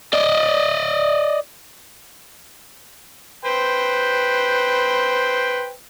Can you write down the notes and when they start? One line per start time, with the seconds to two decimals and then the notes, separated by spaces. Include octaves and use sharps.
0.14 D5 D#5
3.45 B4 C5 G5